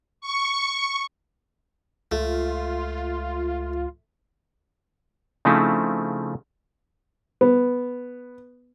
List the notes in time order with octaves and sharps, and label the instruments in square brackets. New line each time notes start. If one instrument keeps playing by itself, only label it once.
[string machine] C#6
[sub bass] C#2 [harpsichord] A3 [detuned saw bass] F4
[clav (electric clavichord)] C#3 F3 A3 C4 D#4 E4
[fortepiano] B3